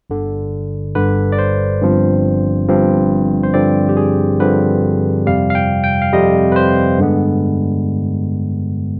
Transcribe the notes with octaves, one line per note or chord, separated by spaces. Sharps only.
G1 G2 D3
G1 G2 D3 B4
D5
C5
G1 G2 F3 C4
G1 G2 F3 C4
C5
G2 D3 F3 C4 D5
G4
G#4
G2 D3 F3 C4 B4
F2 C3 G3 F5
F5
G5
G5
F5
F2 C3 G3 D#5
B4
C5
G2 D3 G#3 B3